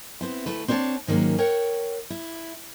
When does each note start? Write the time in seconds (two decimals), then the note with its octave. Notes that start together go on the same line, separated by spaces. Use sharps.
0.21 B3 C4 E4
0.46 D2 A3 E4 B4
0.68 C4 D4 A4 A#4 C#5 A5
1.07 G#2 D#3 F#3 A#3 C#4
1.38 A#4 C#5 F#5 G5
2.10 E4